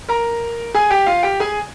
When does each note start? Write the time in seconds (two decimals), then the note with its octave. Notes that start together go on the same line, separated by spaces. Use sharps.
0.09 A#4 A#5
0.75 G#4 G#5
0.90 G4 G5
1.06 F4 F5
1.23 G4 G5
1.40 G#4 G#5